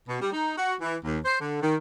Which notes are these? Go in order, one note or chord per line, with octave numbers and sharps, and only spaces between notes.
B2
G3
D#4
F#4
E3
D#2
C5
D3
D#3